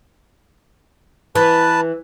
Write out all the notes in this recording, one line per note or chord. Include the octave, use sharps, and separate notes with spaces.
E3 B4 A5